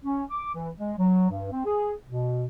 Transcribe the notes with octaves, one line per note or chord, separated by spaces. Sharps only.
C#4
D6
E3
G#3
F#3
G2
C4
G#4
B2